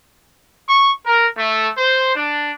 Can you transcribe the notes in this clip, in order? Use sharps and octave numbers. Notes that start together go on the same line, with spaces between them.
C#6
A#4
A3
C5
D4